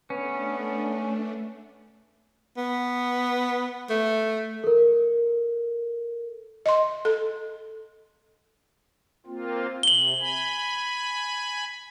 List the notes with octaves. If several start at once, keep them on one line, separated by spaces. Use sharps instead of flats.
A3 B3 C#4 D4
B3
A3
A4 A#4
D#5 C6
A4
A#3 C4 F4
C3 F#7 G7
G#5 B5